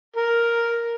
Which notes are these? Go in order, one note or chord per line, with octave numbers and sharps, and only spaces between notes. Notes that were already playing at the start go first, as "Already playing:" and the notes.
A#4